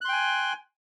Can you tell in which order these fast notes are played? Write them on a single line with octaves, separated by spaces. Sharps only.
F#6 C6 G5 G#5